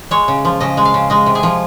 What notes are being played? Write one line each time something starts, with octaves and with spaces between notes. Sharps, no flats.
G#3 C#5
C#3
F3
C#3 D#5
G#3
F5
C#3
G#3 D#5
C3
G#4
F3